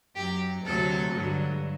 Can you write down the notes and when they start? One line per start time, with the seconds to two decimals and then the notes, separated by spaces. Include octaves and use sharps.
0.16 F#2 F#3 G4
0.65 D2 C3 F#3 A4
1.15 G2 D3 F#3